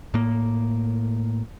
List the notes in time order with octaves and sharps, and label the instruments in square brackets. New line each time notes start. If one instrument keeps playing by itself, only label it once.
[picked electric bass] A2 A#3